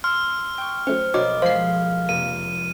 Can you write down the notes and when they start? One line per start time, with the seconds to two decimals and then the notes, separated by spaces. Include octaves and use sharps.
0.04 C6 E6 F6
0.58 G5 C#6
0.87 F#3 A3 C#4 C5
1.14 B1 A#3 D4 F#4 C#5 D#5 D6
1.42 F3 G#3 C5 F5 C7
2.09 F1 A#3 D#7